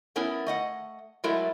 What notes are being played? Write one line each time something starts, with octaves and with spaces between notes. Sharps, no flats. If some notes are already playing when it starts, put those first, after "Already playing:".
A3 B3 C#4 E4 A#4
A3 D#5 F#5
F#3 G#3 A3 E4 A#4